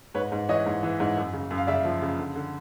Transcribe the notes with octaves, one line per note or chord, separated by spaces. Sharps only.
G#2 B4 C#5
G#2
E3 C#5 D#5
G#2
E3
G#2
F#2
C#3
F#2
F5
C#3 D5 E5
F3
C#3
D3
D3